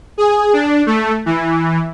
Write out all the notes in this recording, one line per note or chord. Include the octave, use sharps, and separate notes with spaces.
G#4
D4
A3
E3